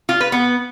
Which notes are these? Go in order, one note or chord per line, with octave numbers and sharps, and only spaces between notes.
F4
B4
B3